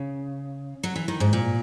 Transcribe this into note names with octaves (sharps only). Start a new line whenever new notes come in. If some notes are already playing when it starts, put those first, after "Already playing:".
Already playing: C#3
F#3
E3
D#3
G#2
A#2